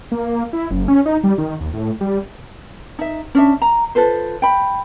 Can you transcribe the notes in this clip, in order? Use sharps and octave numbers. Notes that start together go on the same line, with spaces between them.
A#3
E4
F#1
C#4
D#4
G3
D#3
D#2
A2
G3
D#4 E5
C#4 D4 E5
A#5
F4 A4 B4 C5
G5 B5